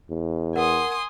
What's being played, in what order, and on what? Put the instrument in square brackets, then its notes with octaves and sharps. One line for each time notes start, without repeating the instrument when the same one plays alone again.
[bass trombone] E2
[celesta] A#4 F#5 [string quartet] G#5 C6 D#6